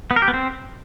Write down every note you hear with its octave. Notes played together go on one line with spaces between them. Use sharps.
B3
A#4
G4
B3
C4